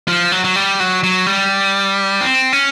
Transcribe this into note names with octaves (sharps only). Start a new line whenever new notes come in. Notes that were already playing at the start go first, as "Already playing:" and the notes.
F3
F#3
F#3
G3
F#3
F#3
G3
C4
C#4